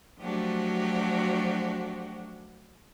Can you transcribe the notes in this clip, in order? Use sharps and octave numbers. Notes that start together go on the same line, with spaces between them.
F3 F#3 A3 D4 F#4 G4